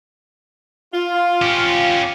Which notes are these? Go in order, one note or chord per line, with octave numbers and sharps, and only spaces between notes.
F4
C#4 G4